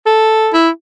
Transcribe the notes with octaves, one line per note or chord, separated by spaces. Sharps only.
A4
E4